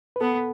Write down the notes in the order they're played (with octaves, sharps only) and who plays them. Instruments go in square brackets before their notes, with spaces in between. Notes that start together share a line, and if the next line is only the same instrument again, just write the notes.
[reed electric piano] B4
[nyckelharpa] B3 [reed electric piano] A4